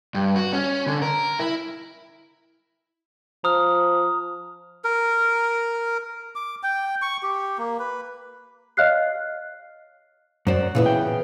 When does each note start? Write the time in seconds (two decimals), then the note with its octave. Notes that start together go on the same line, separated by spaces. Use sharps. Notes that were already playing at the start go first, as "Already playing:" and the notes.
0.15 G2
0.36 F#4
0.53 C#4
0.87 D3
1.02 A#4
1.39 E4
3.44 F3 A#5 D#6 F6
4.84 A#4
6.35 D6
6.63 G5
7.02 C#6
7.23 G4
7.58 A#3
7.79 B4
8.77 C#5 D#5 F5 F6 F#6 C7
10.47 F#2 F#3 F#4 C5 D5
10.75 A#2 C#3 E3 B3
10.86 G5